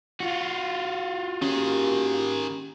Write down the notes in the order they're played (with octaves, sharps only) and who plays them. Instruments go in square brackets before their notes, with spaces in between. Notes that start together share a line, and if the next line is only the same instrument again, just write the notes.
[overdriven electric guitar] F4 F#4
[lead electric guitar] D#3 G#4 [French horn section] A#3 G4 [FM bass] C#4